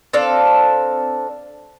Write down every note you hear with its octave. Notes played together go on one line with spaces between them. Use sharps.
C4 D4 A4 F5